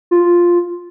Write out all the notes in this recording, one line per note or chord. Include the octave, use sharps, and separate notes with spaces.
F4